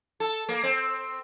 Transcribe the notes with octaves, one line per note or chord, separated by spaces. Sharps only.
A4
A#3
C4